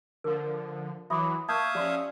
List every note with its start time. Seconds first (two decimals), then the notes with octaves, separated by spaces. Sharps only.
0.24 D3 F3 A#4
1.10 E3 F#3 E5 B5 C6 D6 D#6
1.49 A#3 E5 F5 A5 C#6 D#6 G6 G#6
1.75 F3 C#4 G4 D5 C6